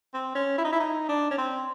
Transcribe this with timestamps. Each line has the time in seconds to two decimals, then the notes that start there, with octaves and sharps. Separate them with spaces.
0.14 C4
0.35 C#4
0.58 E4
0.65 D#4
0.73 E4
0.80 D#4
1.09 D4
1.31 C#4
1.38 C4